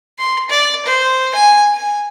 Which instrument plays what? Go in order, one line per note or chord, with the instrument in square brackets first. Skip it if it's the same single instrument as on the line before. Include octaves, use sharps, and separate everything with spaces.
[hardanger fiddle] C6
D5
C5
G#5
G#5